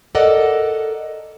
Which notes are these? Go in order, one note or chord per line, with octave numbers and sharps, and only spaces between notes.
A4 A#4 D5 D#5 F#5